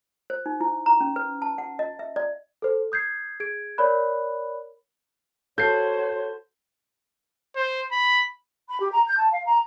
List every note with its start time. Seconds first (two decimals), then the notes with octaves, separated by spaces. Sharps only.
0.30 C5
0.46 D#4
0.61 E4
0.86 A#5
1.00 C#4
1.16 B4
1.42 A5
1.58 F#5
1.79 D#5
1.99 E5
2.16 D5
2.62 A4 C5
2.92 D#6 G6 G#6 C7
3.40 G#4 G#6 D7
3.78 A#4 C#5 D5 B5 F#6
5.58 F#4 A4 C5 C#5 G6 C7
7.56 C5
7.92 B5
8.68 B5
8.80 G4
8.92 A#5
9.07 G6
9.18 A5
9.31 F5
9.46 A#5